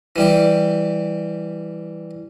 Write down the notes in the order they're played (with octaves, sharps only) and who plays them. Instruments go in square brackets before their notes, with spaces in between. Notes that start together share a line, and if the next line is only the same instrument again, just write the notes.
[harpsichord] E3 G3 G4